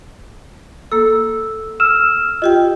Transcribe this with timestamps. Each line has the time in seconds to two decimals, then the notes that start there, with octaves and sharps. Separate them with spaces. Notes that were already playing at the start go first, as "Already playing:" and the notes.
0.92 A#3 A4 E6
1.80 E6 F6 E7
2.42 F4 G4 D#5 G5